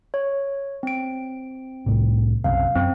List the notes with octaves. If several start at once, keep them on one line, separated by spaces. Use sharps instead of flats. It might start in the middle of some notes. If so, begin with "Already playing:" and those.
C#5
C4 D7
C2 A2 C3
B1 F#2 C3 F5
F#2 C4